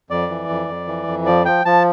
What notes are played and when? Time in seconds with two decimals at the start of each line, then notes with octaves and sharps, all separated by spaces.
0.10 F2 D5
0.29 E3
0.49 F2
0.68 F2
0.87 E3
1.07 F2
1.26 F3 D5
1.46 F3 G5
1.65 F3 A5